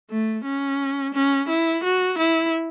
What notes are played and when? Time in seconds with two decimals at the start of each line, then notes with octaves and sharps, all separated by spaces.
0.10 A3
0.45 C#4
1.14 C#4
1.48 E4
1.83 F#4
2.18 E4